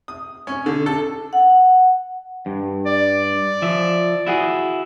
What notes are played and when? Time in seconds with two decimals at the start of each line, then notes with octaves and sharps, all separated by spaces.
0.08 D#6
0.47 C#4
0.66 D3
0.86 A4
1.33 F#5
2.46 G2
2.86 D5
3.62 F3 E5
4.27 E4 F#4 G#4